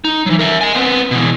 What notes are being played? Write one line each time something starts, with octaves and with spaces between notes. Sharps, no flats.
D#4
E3 F#3
A#4 E5
D#5 G#5
B3 C4
B2 E3